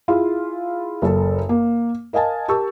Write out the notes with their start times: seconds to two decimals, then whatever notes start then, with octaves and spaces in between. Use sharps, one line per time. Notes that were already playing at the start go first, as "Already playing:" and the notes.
0.08 E4 F4 G#4
1.02 F#1 A4
1.49 A#3
2.13 A#4 D#5 F5 G#5 A5
2.48 G4 A#4 A5 C#6 E6